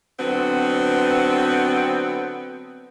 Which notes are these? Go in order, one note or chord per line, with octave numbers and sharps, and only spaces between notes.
D3 F#3 B3 C4